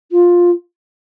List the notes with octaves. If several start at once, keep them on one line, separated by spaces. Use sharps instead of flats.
F4